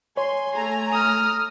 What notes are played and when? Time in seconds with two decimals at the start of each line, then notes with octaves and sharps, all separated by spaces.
0.17 C#5 G#5 C6
0.55 A3 A#5
0.93 D#6 F6